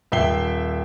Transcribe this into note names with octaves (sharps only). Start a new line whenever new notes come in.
D#1 E5 G5 C7 G7